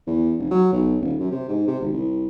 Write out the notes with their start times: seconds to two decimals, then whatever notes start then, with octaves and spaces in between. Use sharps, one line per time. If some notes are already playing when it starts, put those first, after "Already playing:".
0.07 E2
0.38 F1
0.51 F#3
0.73 B1
1.00 D#1
1.19 F#2
1.31 C3
1.48 G#2
1.67 C3
1.80 G#1
1.93 C2